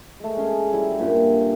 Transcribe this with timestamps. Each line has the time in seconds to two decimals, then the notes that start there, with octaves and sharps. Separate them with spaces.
0.20 G#3 A3
0.36 G#3 C#4 G#4
0.73 F#3 G3 E4
0.99 G2 A#2 D3 G4